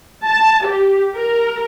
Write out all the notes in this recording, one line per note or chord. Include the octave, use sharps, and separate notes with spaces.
A5
G4
A#4